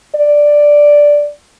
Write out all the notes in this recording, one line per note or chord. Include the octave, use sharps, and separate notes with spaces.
D5